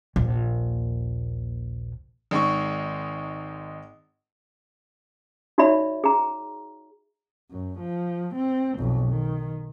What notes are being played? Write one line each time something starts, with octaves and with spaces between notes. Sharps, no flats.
A#1 D#2
G#1 G#3 D#4 C#6
D#4 F#4 C#5 D5 E5 B5
G#4 A#5
F#2
F3
C4
B1 F2
D#3